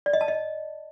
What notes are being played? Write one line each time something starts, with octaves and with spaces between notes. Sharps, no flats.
D5
D#5
A5
D#5